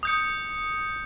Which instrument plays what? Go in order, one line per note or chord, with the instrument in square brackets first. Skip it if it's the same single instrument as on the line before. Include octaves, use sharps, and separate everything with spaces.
[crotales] D#6 G6 C#7